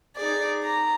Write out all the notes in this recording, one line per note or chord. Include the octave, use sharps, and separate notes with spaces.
D#4 G#4 D5
A#5